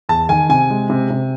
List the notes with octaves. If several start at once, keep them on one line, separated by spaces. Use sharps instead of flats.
E2 A5
D#3 G#5
C3 G#5
G#3
C3
C3